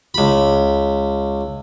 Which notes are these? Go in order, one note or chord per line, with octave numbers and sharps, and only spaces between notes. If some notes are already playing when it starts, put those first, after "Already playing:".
C#2 B5